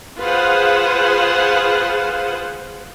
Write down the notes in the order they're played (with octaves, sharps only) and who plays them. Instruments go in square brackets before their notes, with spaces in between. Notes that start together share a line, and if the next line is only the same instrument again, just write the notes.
[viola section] F4 G#4 B4 C5 F5 F#5